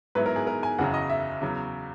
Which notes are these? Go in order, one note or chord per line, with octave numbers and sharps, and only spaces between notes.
G#2 F#3 B3 E4 B4
A#4
G#4
A#4
G#5
F#1 E2 C#3 F#3 F#5
D#5
E5
E2 C#3 F#3